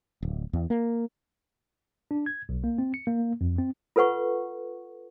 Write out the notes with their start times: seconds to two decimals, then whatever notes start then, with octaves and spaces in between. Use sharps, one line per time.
0.23 D1
0.53 E2
0.70 A#3
2.11 D4
2.26 G#6
2.49 B1
2.64 A#3
2.78 C4
2.94 C#7
3.07 A#3
3.41 F2
3.59 C4
3.96 F4 A4 B4 F#5 C#6